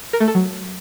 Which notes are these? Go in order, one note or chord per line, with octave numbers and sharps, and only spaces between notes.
A#4
A3
A4
F#3